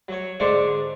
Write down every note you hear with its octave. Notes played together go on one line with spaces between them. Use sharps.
F#3 C#5
G#2 D3 D4 C5 D5 C#6